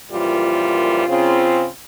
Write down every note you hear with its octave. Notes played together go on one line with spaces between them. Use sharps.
F#2 A#2 E3 F3 G3 F4
C#3 C4 F4